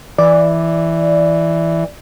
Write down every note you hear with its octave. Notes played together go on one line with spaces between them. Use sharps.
E3 D5